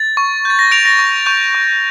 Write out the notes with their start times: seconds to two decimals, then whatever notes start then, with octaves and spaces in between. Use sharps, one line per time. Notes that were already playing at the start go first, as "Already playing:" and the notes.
Already playing: A6
0.17 C#6
0.45 G6 A6
0.59 A#6
0.71 G6 D7 F7
0.85 A#6
0.99 C#6
1.26 C#6 G6
1.55 C#6